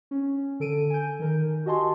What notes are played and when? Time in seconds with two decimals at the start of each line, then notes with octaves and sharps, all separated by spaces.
0.11 C#4
0.60 D3 A4 D7 D#7
0.90 G#5 G6
1.20 D#3 A#4
1.66 F#4 G4 D#5 G#5 A5 C6